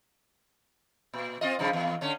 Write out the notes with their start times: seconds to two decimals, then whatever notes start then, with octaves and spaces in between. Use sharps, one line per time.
1.13 A#2
1.41 C4 F4 D#5
1.59 G2 C#3 F3
1.73 E2
2.01 D3 C#4